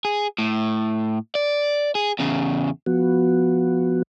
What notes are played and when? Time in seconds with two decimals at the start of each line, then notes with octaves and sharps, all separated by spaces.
0.05 G#4
0.38 A2
1.35 D5
1.95 G#4
2.19 E2 C#3
2.86 F3 B3 F#4